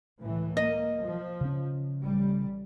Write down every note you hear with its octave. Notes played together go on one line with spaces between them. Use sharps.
C#2 A2 E3
A#3 D#5
F3
C#3 C#4
A1 G3